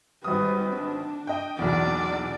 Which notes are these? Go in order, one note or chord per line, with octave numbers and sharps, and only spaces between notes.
G#1 G3 B4 D#6
D4
D#5 G5
B1 E2 D5